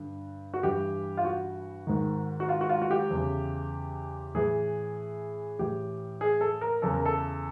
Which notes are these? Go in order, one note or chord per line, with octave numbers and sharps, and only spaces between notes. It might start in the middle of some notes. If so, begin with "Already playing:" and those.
Already playing: G2 D3
F#4
G2 E3 G4
F4
F#4
G#2 D#3
F#4
F4
F#4
F4
F#4
G4
E2 C#3 E3
A2 E3 G#4
A2 E3 G4
G#4
A4
A#4
E2 C#3 E3 A4
A#4
A4